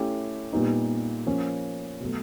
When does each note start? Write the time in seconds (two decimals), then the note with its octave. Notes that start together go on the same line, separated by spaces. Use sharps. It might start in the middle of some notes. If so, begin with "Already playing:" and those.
Already playing: A3 C#4 E4 G4
0.53 A#2 G3 B3 D#4
1.26 F3 A#3 C#4
2.00 B2 F#3 A3